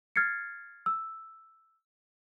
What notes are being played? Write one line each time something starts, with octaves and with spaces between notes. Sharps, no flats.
F6 G#6 A6 C7 C#7
E6